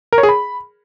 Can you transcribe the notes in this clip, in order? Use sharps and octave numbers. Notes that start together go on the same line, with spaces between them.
A#4
C#5
G#4
B5